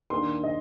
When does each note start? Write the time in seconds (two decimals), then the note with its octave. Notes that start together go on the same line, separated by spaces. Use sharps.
0.10 D#2 D#3 A#3 D4 C6
0.44 D#5